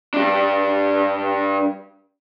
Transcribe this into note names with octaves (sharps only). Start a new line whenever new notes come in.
G2 D4